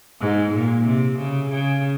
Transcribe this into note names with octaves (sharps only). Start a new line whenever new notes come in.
G#2
A#2
C3
C#3
C#3